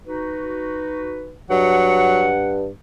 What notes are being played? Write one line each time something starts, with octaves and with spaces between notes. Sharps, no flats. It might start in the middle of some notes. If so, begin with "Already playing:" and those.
D#4 F#4 B4
G2 F#3 F#5